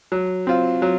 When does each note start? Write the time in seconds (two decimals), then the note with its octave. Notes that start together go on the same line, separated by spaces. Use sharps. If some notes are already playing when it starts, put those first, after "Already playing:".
0.12 F#3
0.47 C4 F4
0.82 F#3